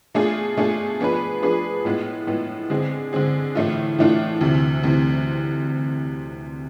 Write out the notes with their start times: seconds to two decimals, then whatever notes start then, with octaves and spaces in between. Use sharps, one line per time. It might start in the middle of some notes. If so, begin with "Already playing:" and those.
0.14 B2 A3 D4 F4 G#4
0.57 B2 A3 D4 F4 G#4
1.00 F3 B3 D4 G#4 B4
1.43 F3 B3 D4 G#4 B4
1.85 A2 G#3 B3 F4
2.27 A2 G#3 B3 F4
2.70 D3 G#3 C4 G#4
3.13 D3 G#3 C4 G#4
3.55 A2 E3 A3 D4 F4
3.98 A2 E3 A3 D4 F4
4.41 D2 C3 E3
4.83 D2 C3 E3